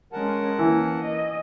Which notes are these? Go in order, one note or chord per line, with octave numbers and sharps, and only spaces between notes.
G#3 C#4 A#4 F#5 A5
E3 A#3 C#4
D#5